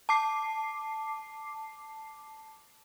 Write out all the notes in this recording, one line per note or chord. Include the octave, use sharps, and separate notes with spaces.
A5 D6 C7